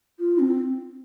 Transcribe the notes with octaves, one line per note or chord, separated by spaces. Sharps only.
F4
C4